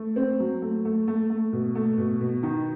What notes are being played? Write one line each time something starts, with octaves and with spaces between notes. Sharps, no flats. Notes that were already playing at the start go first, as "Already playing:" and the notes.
Already playing: A3
C4
F#3
A3
A3
A3
A3
B2
A3
B2
B2
D#3